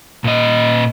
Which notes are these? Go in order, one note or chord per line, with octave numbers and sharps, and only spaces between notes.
A#2 D#5